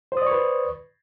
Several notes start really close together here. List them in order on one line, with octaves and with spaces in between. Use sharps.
C5 D#6 D5 C#6 B4